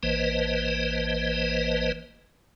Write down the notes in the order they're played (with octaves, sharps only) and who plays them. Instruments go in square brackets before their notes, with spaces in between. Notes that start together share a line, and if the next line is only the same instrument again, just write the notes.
[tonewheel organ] A1 E3 A#3 B4 C5 D#5